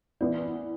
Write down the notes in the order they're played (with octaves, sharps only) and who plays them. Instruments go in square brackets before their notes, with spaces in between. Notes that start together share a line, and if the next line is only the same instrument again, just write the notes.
[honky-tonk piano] E3 B3 E4 [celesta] D5